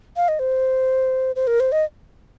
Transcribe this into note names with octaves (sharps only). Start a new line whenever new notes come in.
F5
D#5
C5
C5
A#4
C5
D#5